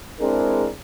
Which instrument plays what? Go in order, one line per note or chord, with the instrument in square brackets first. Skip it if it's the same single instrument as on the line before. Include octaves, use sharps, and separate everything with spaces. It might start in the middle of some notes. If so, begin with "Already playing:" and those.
[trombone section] G#3 C4 D4 E4 G#4 A#4